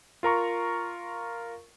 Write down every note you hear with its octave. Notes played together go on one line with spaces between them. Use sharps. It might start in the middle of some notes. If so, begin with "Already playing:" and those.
F4 A#4 A#5 C#6